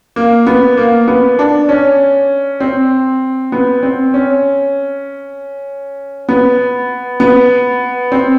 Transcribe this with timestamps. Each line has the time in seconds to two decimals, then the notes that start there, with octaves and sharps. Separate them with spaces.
0.16 A#3
0.47 B3
0.77 A#3
1.08 B3
1.39 D4
1.69 C#4
2.60 C4
3.52 B3
3.83 C4
4.14 C#4
6.29 B3
7.20 B3
8.12 C4